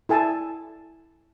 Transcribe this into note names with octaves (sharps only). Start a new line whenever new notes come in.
E4 A4 G#5 A5